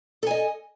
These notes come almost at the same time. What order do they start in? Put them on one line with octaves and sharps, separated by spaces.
A4 G#5 D#5